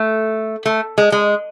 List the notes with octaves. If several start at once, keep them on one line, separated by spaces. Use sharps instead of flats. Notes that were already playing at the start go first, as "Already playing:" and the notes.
Already playing: A3
A3
G#3
G#3